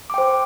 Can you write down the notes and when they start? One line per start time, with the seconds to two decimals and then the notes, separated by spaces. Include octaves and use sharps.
0.10 D6
0.14 G5
0.18 C5